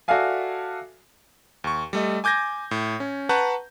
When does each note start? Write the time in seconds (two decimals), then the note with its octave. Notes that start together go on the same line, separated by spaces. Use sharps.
0.08 F#4 A4 D5 E5 F5 G#5
1.64 D#2 C#6
1.93 G3 A3 D#5
2.24 G#5 D6 G6 G#6 A#6
2.71 A2
3.00 C#4
3.29 B4 F#5 A5 A#5 C#6 G6